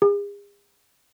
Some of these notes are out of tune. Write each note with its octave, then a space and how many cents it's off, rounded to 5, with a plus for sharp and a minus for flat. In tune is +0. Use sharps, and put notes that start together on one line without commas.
G#4 -40